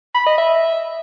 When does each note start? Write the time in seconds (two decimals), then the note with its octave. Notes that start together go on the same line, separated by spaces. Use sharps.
0.15 B5
0.26 D#5
0.38 E5